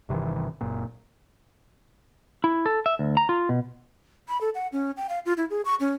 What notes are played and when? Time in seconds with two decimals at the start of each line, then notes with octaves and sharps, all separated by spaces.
0.09 G1 C3 D#3 E3
0.61 F#1 A#2
2.44 E4
2.66 A4
2.86 E5
2.99 D2
3.17 A#5
3.29 F4
3.49 B2
4.29 B5
4.41 A4
4.55 F#5
4.73 C#4
4.97 G5
5.09 F5
5.26 F4
5.37 E4
5.50 G#4
5.65 C#6
5.80 C#4